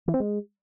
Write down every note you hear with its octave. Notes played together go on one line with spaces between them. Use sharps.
E3
C4
G#3